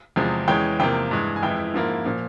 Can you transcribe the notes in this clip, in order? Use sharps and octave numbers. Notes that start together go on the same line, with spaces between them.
E2 C3 F3 G#3
E2 E3 G#3 C#4 G5
E2 C3 F3 A#3 G5
G2 E3 G#3
G#5
F2 E3 G#3 E4 G5
G#2 F3 A#3 E4
A#2 F3